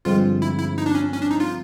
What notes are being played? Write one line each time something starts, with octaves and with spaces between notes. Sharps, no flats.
G2 D3 F3 G#3 C4 F4
E4
E4
D#4
D4
C#4
C#4
D4
D#4
F4